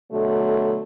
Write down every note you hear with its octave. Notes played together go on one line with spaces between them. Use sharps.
B2 D3 F#3 A3